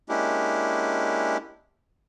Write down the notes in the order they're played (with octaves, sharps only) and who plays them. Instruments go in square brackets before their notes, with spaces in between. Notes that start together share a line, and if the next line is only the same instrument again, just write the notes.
[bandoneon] G#3 A#3 C#4 D4 E4 G4